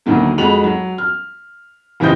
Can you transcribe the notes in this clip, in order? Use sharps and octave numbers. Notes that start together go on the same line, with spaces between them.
D2 D#3 F#3 A#3
F2 G#3 F#4 B5 F7 F#7
F#3
F6
F#1 E3 F3 G4 D#5 G6